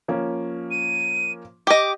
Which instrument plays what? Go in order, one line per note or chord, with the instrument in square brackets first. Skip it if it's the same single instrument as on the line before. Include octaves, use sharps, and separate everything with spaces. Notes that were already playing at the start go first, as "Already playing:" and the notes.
[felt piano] F3 A#3 C#4
[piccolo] D#7
[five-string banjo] G4 D#5 [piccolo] D6